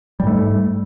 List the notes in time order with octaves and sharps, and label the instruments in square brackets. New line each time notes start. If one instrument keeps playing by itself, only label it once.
[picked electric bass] G3
G#2
A3